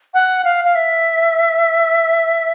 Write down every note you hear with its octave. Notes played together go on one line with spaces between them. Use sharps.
F#5
F5
F5
E5